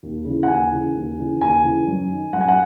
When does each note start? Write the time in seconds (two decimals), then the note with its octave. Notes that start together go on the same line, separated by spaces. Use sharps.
0.03 D#2
0.25 C#3
0.30 E3
0.43 F#5
0.48 D#2 G#5
0.72 C#3 E3
0.94 D#2
1.18 C#3 E3
1.41 D#2 G#5
1.64 C#3 E3
1.87 F#2
2.10 D#3
2.32 F#2 F#5
2.41 G#5
2.48 F#5